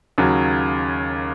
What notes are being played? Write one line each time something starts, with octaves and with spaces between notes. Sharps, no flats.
D#2 C#3 F#3